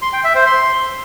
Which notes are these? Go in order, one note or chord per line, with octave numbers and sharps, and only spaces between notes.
C6
G5
E5
C5
C6